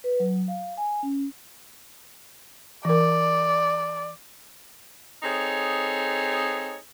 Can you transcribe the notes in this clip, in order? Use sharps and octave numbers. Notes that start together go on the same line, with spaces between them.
B4
F#3
F5
G#5
C#4
E3 A#4 D5
C4 D#4 G#4 A4 C#5